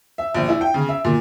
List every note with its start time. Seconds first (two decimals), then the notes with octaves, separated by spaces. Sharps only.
0.18 E5
0.35 A#1
0.48 E4
0.61 G5
0.74 C#3
0.89 E5
1.05 A#2